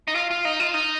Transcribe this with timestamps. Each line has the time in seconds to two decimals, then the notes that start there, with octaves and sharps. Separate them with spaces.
0.08 D#4
0.15 F4
0.31 F4
0.45 D#4
0.60 F4
0.74 D#4